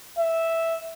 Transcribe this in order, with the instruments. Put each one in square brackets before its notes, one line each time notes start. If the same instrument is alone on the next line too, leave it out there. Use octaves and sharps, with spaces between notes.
[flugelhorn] E5